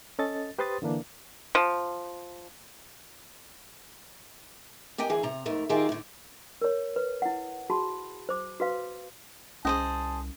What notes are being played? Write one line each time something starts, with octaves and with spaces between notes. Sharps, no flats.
C#4 A4 D#5 A6
G4 B4 C5 C6 D#6 A6
D3 E3 A#3 D4
F3
G4 A#4 D#5 G5 G#5
D2 E3 G#4
C3 A#5
F2 G#2 A3 A#4
D#3 F4 G4 G#4 A#4 E5
A2 D3
A#4 C#5
B4
E4 F#5
F#4 G#4 A5 B5 C6
C5 D6
F#4 B4 F5
C2 C#4 G#4 C5 D#5 A5